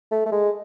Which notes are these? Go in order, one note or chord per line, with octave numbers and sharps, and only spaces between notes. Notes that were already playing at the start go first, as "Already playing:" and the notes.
A3
A3
G#3